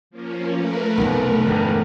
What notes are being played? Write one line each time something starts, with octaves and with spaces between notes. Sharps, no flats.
F3 A#3 C#4
A3 A#4 B4
F1 B1
E1 G2 D3